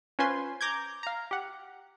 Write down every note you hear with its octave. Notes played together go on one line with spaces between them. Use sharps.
C#4 F4 B4 C5 G#5 C6
A#5 D6 G6 G#6
F5 A#5
G4 F#5